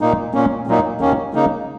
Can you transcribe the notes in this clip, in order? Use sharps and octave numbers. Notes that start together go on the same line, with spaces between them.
A#2 A#3 D#4
A#2 A#3 C#4
A#2 F#3 A#3 D#4
D#2 D#3 A#3 C#4
C#3 A#3 D#4